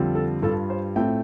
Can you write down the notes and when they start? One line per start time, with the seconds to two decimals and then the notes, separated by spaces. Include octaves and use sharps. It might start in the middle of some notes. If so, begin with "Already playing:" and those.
Already playing: F2 D3 G3 C4 F4
0.15 A4
0.42 G2 G3 F4 A4
0.70 C5
0.96 A2 A3 C4 F4 G5